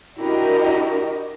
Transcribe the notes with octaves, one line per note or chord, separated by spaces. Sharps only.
D4 E4 F#4 G4 A#4 D#5